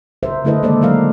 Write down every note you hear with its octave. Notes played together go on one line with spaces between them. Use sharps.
C#3 A#4 C5 E5
D3 A3 E4 A4 B4 D#5
D#3 G#3 A#3 A4 C5 D5
F#3 D#4 A#4 F5